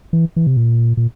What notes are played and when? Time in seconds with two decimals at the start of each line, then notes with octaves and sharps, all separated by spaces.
0.13 E3
0.36 E3
0.47 C3
0.57 A#2
0.97 A#2